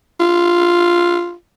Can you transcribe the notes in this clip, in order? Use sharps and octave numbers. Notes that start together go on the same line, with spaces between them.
F4